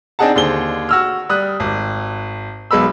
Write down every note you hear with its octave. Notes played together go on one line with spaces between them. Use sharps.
C4 D4 D#4 G#4 F#5 A5
D#2 D3 G#4 C5 G7
F#4 E6 F6
G3 D#6 F#6
G#1
B1 G#3 B3 B5 E6